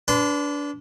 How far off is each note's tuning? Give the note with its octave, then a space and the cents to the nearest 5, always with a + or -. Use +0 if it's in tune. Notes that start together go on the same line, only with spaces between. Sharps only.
D4 -25 B4 +0 C6 -30